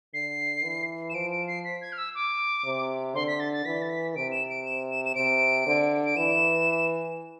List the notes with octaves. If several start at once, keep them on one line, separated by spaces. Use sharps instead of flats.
D3 C7
E3
E7
F3 D7
D7
C7
B6
G#6
F6
E6
D6
C3
D3 C6
B6
A6
A6
E3 B6
A6
B6
C3 D7
E7
D7
E7
E7
E7
C3 D7
D3
D7
E3 E7